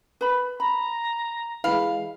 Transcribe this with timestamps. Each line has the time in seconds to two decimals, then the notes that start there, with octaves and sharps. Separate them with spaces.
0.21 B4 B5
0.60 A#5 B5
1.64 E3 G#3 F5 B5